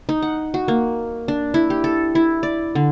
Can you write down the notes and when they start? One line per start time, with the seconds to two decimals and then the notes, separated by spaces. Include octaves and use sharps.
0.09 D#4
0.22 F#5
0.54 F#4
0.68 A#3
1.28 D4
1.54 E4
1.70 G4
1.84 A4
2.15 E4
2.43 D5
2.75 D3